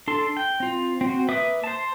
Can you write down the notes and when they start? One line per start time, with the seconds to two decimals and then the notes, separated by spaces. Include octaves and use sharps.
0.08 D4 A4 C6
0.37 G5
0.60 C4 F4
1.01 C4 F#4
1.28 A#3 B4 E5 D6 D#6
1.64 C5 A5